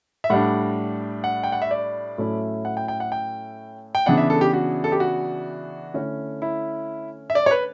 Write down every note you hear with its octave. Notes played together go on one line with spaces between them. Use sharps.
E5
A2 G3 D4 F#5
F#5
G5
F#5
E5
D5
A2 F#3 A3 C#4 E4
F#5
G5
G5
F#5
G5
G5
C#3 E3 B3 D4 F#5
E5
A4
G4
F#4
A4
G4
F#4
D3 A3 C#4 E4
E4
E5
D5
C#5
B4